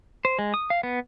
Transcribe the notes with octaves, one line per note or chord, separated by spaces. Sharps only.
C5
G#3
D#6
F5
B3